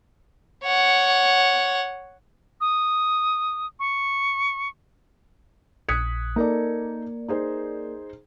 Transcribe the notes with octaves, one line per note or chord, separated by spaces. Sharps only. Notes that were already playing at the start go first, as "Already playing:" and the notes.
C#5 F#5
D#6
C#6
A#1 D#6 F#6 G#6 B6 C#7
A#3 D#4 A4 A#4 D5
D#4 G#4 C5